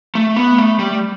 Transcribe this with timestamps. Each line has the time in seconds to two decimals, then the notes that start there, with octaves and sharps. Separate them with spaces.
0.15 A3
0.36 B3
0.58 A3
0.79 G3